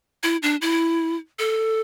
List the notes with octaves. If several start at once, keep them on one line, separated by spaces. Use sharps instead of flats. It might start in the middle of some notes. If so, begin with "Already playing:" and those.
E4
D4
E4
A4